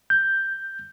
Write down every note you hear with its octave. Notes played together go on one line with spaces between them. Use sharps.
G6